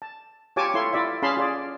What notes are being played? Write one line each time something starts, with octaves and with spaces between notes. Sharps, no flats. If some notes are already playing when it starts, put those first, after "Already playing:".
A5
F4 G4 C#5 G#5 A5 D6
E4 F4 A4 C#5 C6
E4 F4 D5 E5
C#4 G#4 F5 A5 B5 C6
F4 G#4 D5